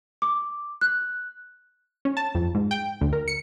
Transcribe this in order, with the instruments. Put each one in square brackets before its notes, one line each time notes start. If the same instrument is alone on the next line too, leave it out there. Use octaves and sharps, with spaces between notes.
[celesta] D6
F#6
[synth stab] C#4
A5
F2
G#2
G5
D2
A#4
C#7